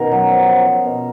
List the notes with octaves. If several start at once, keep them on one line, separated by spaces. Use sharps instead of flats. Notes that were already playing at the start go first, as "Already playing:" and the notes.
Already playing: B2 D#3 C#4 A#4
F#3
F3
F3
F3
B2